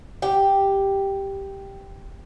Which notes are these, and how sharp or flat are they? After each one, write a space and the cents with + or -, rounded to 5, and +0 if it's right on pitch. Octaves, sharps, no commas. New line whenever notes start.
G4 +0 G5 +0